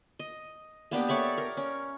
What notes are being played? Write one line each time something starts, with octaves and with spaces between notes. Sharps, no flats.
D#5
A#3 B3 D4 G4
A4 C#5 D5 E5
A#4
C#4